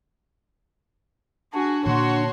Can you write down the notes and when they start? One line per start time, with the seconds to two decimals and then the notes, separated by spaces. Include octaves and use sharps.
1.54 D4 F#4 G#4
1.86 A#2 D3 F#4 C#5 C6